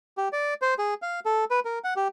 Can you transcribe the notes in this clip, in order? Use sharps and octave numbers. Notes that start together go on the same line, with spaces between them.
G4
D5
C5
G#4
F5
A4
B4
A#4
F#5
G4